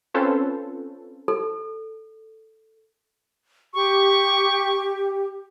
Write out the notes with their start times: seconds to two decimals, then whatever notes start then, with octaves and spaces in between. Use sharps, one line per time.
0.14 C4 C#4 F4 A4 B4 C5
1.28 A4
3.74 G4 C#6